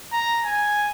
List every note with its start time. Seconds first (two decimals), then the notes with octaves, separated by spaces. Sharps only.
0.12 A#5
0.44 G#5